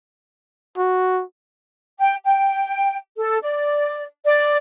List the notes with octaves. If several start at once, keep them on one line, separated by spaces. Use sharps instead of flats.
F#4
G5
G5
A4
D5
D5